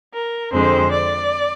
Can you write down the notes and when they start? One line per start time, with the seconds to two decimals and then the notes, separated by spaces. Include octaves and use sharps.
0.14 A#4
0.53 F2 D3 G#3 C4 C5
0.92 D5